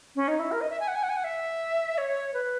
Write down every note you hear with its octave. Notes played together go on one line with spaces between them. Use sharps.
C#4
D#4
E4
A#4
D#5
E5
G#5
F#5
G#5
F#5
G#5
F#5
E5
C#5
B4